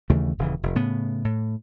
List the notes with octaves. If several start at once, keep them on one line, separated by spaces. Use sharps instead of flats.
D#2 C#3 E3 A3
D#1 C#3 E3
F1
A2 C#3 B3
A2